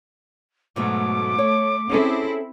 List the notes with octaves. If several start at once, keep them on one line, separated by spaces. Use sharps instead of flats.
G#2 B2 F#3 A3 D6
C#5
C4 C#4 E4 G#4 A4